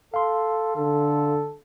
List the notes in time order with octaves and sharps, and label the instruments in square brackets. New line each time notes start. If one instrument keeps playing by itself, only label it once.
[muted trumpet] A4 [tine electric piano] F5 C6
[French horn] D3 [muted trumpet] A4